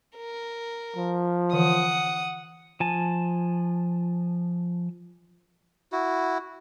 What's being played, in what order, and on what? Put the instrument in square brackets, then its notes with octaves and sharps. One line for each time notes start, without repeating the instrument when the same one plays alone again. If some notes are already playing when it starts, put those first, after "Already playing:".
[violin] A#4
[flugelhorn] F3
[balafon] D3 E3 [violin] F#5 D#6
[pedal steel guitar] F3 G#5 A5
[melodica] E4 F#4